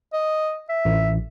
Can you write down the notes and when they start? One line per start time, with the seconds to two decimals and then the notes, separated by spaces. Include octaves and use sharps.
0.13 D#5
0.69 E5
0.85 A1